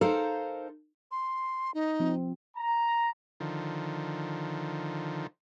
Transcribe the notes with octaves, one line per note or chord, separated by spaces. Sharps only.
D#4 A4 A#4 C5 F5
C6
D#4
F3 C4
A#5
D3 D#3 F3